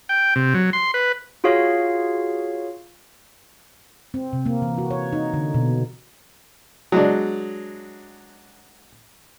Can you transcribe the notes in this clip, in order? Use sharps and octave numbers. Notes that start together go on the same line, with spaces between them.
G5
C3
F#3
C6
B4
F4 F#4 G#4 C#5 F5
C4
C3
A#3
E3
F#4
C#5
D#4
D3
B2
F#3 G#3 D4